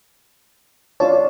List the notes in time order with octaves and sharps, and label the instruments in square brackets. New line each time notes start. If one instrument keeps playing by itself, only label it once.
[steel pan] D4 F4 A5 [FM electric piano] C#5 D5